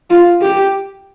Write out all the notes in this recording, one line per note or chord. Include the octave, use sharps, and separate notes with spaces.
F4
G4